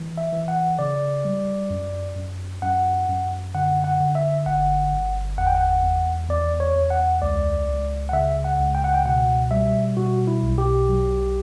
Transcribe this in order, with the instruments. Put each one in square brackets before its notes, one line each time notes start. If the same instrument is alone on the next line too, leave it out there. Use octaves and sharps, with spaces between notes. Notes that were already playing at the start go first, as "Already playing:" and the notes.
Already playing: [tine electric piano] E3
E5
E3
F#5
C#3 D5
G3
F#2
F#2
F#2 F#5
F#2
D3 F#5
F#5
D3
E5
G1 F#5
G1
E2 F#5
G5
F#5
E2
E2 D5
C#5
E2
F#5
C#2 D5
C#2
F#5
C#3 E5
F#5
C#2
G5
F#5
G5
B2 F#5
G3 E5
B2 F#4
E4
B1
G4
F#3